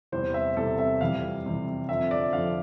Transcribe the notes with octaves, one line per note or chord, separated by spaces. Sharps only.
E2 C3 E3 G3 C5
E5
E2 C3 E3 G3 A4
E5
F2 C3 E3 G3 F5
F2 C3 E3 G3
F2 D3 F3 E5
D5
F2 D3 F3 F5